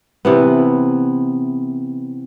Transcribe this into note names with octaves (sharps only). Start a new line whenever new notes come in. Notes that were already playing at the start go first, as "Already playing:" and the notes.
C3 E3 B3